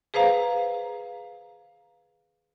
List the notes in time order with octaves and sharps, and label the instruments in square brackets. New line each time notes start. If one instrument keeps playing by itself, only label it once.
[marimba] G#4 B4 C5 F5 A#5